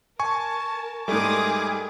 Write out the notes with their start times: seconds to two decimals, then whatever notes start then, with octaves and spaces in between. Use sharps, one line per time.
0.19 A#4 G#5 A5 C#6
1.08 G#2 G3 A3 G#4 A#4 D6 D#6